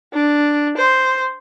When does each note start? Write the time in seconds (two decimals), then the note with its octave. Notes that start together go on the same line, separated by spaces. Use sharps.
0.13 D4
0.77 C5